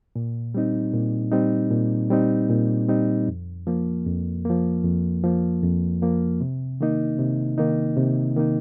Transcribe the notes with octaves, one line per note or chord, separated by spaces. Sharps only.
A#2
G3 C4 D#4
A#2
G3 C4 D#4
A#2
G3 C4 D#4
A#2
G3 C4 D#4
F2
F3 A#3
F2
F3 A#3
F2
F3 A#3
F2
F3 A#3
C3
D#3 A#3 D#4
C3
D#3 A#3 D#4
C3
D#3 A#3 D#4